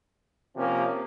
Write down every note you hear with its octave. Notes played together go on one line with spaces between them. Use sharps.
C3 F3 A#3 C#4